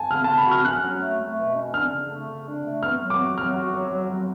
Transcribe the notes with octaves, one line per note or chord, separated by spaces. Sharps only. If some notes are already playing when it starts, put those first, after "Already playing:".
Already playing: G#5 A5
C#3 F6
A5
C#3
B5
F#4
F6
C#4 F#6
F#3
A3
A3
B2
C#4
D4 F6
C#3
A3
C#3
D4
A3
B3 F6
F#3
D6
F#4
F#3 F6
F#4
F#3
F#3
F#3